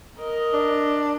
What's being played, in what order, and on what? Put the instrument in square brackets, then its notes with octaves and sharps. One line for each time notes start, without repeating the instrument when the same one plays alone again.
[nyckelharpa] A#4 D#5
[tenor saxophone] D4